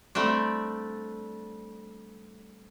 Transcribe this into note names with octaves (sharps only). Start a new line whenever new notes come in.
G3 A3 C4 D4